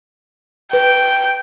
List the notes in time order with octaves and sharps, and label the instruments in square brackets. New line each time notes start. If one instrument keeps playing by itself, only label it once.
[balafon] B4 [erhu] G5